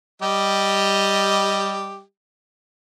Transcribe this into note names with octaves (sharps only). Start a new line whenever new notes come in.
G3 G4 D#5